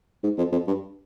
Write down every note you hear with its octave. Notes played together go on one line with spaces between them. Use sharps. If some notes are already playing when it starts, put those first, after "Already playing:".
G#2
F2
F2
G2